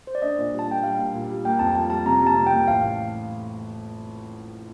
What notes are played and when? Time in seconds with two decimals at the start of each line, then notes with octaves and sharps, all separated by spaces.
0.07 C5
0.15 D5
0.22 D4 D#5
0.37 A#2
0.53 G3
0.59 A5
0.68 A#2 G5
0.83 G3 F5
0.99 A#2
1.14 A#2
1.30 G3
1.45 A#3 G5
1.59 F2 A5
1.75 G3 A5
1.90 G3 A5
2.06 C3 A#5
2.21 G3
2.27 A5
2.37 C3
2.47 G5
2.52 A#3
2.67 A1 F5